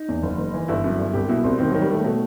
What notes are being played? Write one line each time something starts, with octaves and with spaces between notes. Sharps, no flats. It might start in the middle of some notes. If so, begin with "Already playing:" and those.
Already playing: D#4
E2
F#1
F#1
E3
G1 E4
F#2
G1
C2 G4
B2 E4
C2 C4
D#3 C4
D#3 F#3
G3
D#3 A3
B2 A3